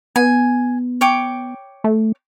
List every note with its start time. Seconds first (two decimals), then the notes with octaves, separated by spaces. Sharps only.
0.16 B3 G#5
1.01 C#5 G5 D6
1.84 A3